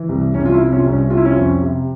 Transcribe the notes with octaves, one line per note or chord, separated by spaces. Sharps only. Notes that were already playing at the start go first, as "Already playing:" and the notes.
Already playing: E3
C2
C2 C#4
F4
E4
C3
C#4 F4
C2
C#4
C3 F4
E4
C#4 F4
F2
C3